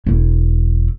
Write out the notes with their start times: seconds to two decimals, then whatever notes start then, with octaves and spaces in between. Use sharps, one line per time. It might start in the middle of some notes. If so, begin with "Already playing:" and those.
0.07 E1 E4